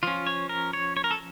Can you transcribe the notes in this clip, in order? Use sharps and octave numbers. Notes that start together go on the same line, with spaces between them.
F3 C#4 F4
C#5
A#4
C#5
C#5
A#4
A4